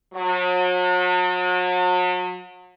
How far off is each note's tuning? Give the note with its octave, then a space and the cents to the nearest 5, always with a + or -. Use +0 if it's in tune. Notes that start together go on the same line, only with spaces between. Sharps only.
F#3 -40